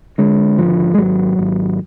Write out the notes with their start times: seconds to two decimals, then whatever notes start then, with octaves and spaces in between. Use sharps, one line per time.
0.18 D3 G#3
0.58 G#1 F3
0.94 G#3
0.98 G#1 F#3
1.39 G#1